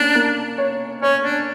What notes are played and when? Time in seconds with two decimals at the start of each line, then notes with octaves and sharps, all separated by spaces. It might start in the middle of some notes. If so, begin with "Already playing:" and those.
Already playing: A#3 C#4 D4
0.15 A#3
0.58 C#5
1.02 C#4 C#5
1.24 D4